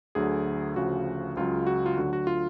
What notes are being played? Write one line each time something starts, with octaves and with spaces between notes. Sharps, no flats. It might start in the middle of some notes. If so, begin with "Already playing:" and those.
D2 D3 F#3 G#4
D2 C#3 F3 F#4
C#2 C#3 F#3 F4
F#4
F4
D2 D3 F#3 F#4
F#4
F4